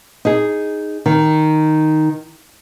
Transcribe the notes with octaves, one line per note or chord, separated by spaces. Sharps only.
D#4 G#4
D#3